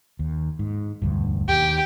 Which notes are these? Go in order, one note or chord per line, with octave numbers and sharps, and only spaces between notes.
D#2
G#2
E1 D2 G2
D#2 G4